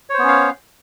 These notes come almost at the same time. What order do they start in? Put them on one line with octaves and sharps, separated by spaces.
C#5 C5 B3 C#4 F5